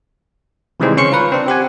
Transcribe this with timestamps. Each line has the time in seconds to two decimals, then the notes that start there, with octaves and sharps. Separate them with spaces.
0.80 C3 D#3 E3 G3 G#3 C4
0.97 C#3 C#4 C6 C#6 C#7
1.12 F4 A#4 B4
1.32 C4 D4
1.47 C4 G4 F#5 G#5